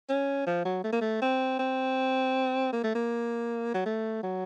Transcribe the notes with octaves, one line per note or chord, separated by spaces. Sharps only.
C#4
F3
F#3
A3
A#3
A3
C4
C4
A#3
A3
A#3
F#3
A3
F#3